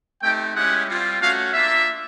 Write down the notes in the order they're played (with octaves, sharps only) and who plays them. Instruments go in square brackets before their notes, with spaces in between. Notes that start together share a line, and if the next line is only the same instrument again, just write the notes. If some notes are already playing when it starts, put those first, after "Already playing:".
[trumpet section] A3 C4 D#4 G4 G5
G#3 C#4 E4 G4 F#5
G3 C4 F4
A3 C#4 F#4 F5
A#3 D4 F4 E5